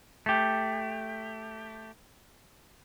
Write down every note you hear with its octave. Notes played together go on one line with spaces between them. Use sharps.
A3 G4